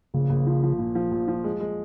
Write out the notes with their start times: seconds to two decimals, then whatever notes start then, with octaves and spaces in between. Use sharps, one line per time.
0.14 A#1 C#3
0.30 A#1
0.47 F3
0.63 F3
0.79 A#2
0.95 F3
1.11 A#1
1.28 F3
1.44 G#3
1.60 G#3